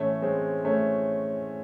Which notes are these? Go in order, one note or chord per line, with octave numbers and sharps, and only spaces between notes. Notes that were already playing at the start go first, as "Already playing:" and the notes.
Already playing: A2 E3 A3 C#4
G#3 C4
A3 C#4